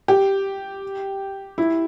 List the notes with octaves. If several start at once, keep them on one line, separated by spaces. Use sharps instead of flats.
G4
E4